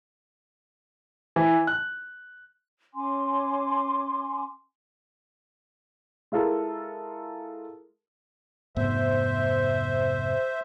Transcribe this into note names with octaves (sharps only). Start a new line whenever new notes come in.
E3
F#6
C#4 G#5 C6 D6
G#3 E4 F4 A4 A#4
F1 G#2 B3 C5 E5